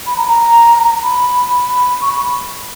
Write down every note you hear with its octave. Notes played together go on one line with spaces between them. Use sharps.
B5
A#5
A#5
B5
B5
C#6
B5